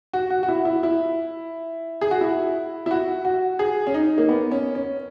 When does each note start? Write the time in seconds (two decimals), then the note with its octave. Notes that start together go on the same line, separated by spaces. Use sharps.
0.13 F#4
0.30 F#4
0.43 F#4
0.48 E4
0.65 E4
0.83 E4
2.01 G#4
2.11 F#4
2.21 E4
2.86 E4
2.91 F#4
3.25 F#4
3.59 G#4
3.87 C#4
3.94 D#4
4.18 A#3
4.29 B3
4.51 C#4
4.75 C#4